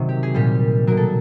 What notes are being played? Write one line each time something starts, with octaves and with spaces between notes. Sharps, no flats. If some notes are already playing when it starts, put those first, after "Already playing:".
Already playing: C3 D#3 F#3
G4
G#4
A#2 G3 G4
B2 F#3 A#4
A4